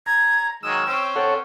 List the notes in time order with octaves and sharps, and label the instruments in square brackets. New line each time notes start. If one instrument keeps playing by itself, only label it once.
[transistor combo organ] A#5 [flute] G#6
[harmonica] D#3 F#3 G#3 [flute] D#6 [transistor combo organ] E6
[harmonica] C4 C#4 [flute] G5
[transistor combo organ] A4 C#5 F#5